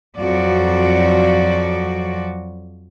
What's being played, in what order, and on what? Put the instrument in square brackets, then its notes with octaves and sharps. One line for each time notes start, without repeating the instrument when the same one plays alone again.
[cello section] F2 F3 F#3 F#4 D5